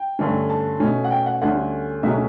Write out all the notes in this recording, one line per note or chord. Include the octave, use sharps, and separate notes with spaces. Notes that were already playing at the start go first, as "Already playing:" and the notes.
Already playing: G5
G2 D3 A3 C#4
A5
B2 A3 C#4
F#5
G5
F#5
D2 D3 G3 C#4 F#5
C#2 B2 F#3 A3 C#4 E5